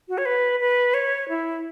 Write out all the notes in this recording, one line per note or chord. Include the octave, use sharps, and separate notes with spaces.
F#4
C#5
B4
B4
C#5
E4